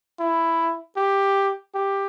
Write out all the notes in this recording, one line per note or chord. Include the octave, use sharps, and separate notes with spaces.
E4
G4
G4